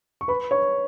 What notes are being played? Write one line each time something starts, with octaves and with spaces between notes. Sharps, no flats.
C#6
B4 B5
C#5 C#6